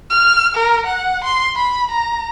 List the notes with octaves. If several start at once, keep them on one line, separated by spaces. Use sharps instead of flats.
F6
A#4
F#5
C6
B5
A#5